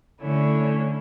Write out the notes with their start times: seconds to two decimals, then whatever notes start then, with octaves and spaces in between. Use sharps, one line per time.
0.21 D3 A3 C#4 E4